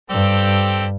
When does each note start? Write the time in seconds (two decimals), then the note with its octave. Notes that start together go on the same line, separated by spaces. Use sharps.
0.10 G2 C4 G4 A4